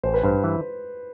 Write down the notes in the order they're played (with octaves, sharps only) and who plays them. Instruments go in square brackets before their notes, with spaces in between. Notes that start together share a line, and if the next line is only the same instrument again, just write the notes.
[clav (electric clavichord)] A1 [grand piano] C5
[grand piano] B4
[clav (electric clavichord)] G2 [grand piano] C5
[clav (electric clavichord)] E3